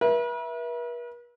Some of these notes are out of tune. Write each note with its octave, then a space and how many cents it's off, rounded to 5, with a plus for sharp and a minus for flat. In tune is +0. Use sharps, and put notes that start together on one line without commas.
B4 -45 E5 +0